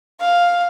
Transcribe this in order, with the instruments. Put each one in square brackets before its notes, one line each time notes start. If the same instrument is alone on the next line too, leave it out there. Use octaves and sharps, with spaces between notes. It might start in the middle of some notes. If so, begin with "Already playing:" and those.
[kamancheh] F5